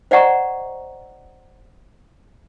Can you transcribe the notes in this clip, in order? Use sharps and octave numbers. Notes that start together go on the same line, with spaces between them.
C5 D5 D#5 F#5 A#5 C#6